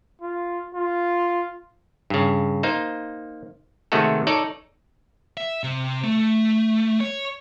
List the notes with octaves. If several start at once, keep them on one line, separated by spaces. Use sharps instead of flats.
F4
F4
G2 C#3
A#3 D#4 C5
C3 D#3 G#3 A3 F#4 A4
D#4 A4 C#5 D5
E5
C3
A3
C#5